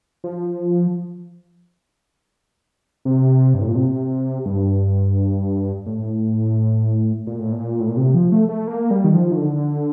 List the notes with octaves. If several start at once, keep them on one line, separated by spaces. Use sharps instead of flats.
F3
C3
G2
A2
A#2
C3
G2
A2
A#2
A2
A#2
A2
A#2
C3
F3
A3
A3
A#3
G3
D#3
F3
D#3
D3